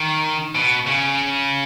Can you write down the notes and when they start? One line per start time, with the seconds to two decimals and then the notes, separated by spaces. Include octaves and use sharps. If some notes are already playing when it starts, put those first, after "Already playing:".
Already playing: D#3
0.55 B2
0.87 C#3